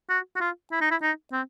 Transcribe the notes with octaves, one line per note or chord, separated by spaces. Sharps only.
F#4
F#4
F4
E4
D#4
E4
D#4
C4